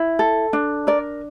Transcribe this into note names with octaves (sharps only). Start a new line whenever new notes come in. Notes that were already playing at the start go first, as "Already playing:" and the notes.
Already playing: E4
A4
D4
A#4 D5